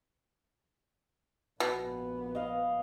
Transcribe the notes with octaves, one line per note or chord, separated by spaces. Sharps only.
A#1 B2 B3
D#5 F5